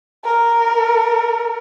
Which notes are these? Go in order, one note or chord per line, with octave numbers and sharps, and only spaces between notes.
A#4